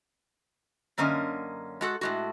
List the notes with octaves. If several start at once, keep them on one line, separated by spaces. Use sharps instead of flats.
F#2 D3 A#3 C#4 D#5
G#3 F#4 A4
A2 G#3 F#4